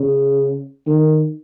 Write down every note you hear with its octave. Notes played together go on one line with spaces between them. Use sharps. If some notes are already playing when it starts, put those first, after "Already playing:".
Already playing: C#3
D#3